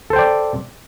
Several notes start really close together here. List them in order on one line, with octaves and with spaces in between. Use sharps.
A4 C5 G5 D5